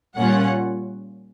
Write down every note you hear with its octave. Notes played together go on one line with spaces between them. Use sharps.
A#2 G3 A#3 C#4 F4 F#5